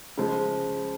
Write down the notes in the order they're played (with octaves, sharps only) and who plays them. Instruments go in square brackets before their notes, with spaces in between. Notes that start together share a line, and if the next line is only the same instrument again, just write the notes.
[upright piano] C#3 F3 G#3